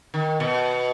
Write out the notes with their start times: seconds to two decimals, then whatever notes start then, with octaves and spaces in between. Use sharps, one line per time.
0.14 D#3
0.40 B2